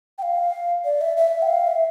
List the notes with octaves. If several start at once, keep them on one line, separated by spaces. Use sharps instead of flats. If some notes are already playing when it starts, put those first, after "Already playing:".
G5
F5
D5
E5
E5
G5
F5
E5